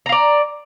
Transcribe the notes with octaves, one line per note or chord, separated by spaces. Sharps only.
D5 F5 A#5